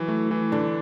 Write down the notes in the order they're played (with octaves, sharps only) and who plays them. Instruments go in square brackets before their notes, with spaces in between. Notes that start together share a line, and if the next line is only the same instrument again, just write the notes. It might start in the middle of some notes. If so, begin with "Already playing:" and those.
Already playing: [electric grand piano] E3 [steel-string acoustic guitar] F#3
[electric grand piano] A3
E3
[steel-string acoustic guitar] D3 [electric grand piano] D4